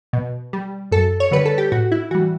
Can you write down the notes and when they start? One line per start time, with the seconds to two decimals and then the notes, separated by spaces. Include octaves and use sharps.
0.13 B2
0.53 G3
0.92 F#2 A4
1.20 C#5
1.31 D3 G3 B4
1.45 A4
1.58 G4
1.72 A2 F#4
1.92 E4
2.11 E3 G3 F#4